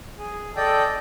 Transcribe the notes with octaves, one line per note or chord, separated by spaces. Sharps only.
G#4
A4 D5 D#5 G5